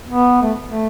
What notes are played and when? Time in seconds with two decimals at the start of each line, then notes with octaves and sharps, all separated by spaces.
0.08 B3
0.42 A3
0.65 A3